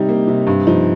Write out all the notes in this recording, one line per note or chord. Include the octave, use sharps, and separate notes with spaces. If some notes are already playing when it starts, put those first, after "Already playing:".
Already playing: C3 G3 D#4
A#3
C3
G2
F3 D#4